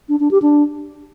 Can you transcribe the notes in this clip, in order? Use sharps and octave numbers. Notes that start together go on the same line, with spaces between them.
D4
D4
G4
D4